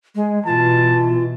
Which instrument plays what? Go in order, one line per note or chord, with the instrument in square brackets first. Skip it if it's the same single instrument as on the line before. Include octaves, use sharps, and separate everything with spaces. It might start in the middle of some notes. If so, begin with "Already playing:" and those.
[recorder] G#3
[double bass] B2 E3 [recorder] F4 [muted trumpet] A5